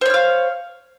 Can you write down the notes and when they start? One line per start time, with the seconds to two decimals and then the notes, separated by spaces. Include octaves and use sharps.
0.01 C5
0.06 C#5
0.10 F6
0.14 F5